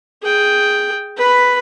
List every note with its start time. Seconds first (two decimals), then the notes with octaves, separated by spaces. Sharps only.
0.23 G#4 G5
1.18 B4 B5